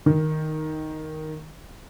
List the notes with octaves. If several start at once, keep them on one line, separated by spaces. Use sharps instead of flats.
D#3